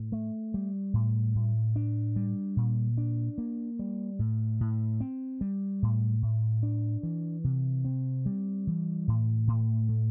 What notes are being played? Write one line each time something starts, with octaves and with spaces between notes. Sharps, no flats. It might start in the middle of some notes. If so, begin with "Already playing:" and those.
Already playing: A2
A3
G3
A2
A2
D4
G3
A#2
D4
A#3
G3
A2
A2
C4
G3
A2
A2
D4
E3
C3
C4
G3
E3
A2
A2
A3